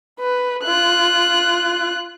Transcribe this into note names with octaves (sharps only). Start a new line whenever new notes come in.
B4
F4 F#6